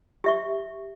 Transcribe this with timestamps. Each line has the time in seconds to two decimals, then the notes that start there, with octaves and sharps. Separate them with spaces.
0.24 G4 E5 C#6